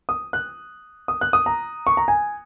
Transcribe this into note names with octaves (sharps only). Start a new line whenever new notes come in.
D#6
F#6
D#6
F#6
D#6
A#5
C#6
A#5
G#5